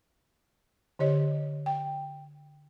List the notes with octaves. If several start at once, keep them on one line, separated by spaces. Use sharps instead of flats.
D3 G4 C#5 D#5
G5